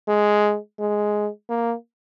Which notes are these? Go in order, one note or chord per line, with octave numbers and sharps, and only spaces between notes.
G#3
G#3
A#3